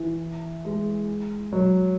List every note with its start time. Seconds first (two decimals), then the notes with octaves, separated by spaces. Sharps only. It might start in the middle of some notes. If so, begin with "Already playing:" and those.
Already playing: E3
0.65 G#3
1.53 F#3